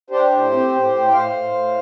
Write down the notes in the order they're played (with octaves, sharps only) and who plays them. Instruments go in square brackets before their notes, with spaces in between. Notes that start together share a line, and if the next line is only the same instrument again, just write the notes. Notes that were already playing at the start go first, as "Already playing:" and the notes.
[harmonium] D4 G4 C5
A2
C4
A2
A2
G5
A2 C5 F5
A2
A2